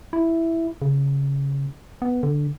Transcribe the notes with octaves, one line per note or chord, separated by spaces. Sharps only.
E4
C#3
B3
D3